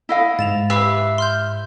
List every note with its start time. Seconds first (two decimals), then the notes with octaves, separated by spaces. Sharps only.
0.09 E4 D#5 F5
0.39 G#2 A6 E7 F7
0.70 G4 B4 E5 B5 D6 C7
1.18 C6 F6 G6